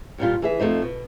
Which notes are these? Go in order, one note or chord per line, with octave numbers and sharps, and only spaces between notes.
G2 A#2 G3 F4
E3 G#4 E5
F2 A3 D#4 C5
B2